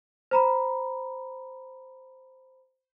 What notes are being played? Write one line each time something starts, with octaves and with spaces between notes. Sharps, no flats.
C5 A#5 B5